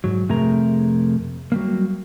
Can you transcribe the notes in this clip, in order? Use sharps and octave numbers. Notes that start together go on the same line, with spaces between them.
G#2 F#3
F2 C3 A3 G#4 A#4 A#5
F#3 G3 A#3